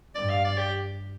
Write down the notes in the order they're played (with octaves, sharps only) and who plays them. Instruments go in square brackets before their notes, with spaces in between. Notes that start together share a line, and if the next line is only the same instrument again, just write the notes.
[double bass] G2 [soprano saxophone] D5
[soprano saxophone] F5
D5
G4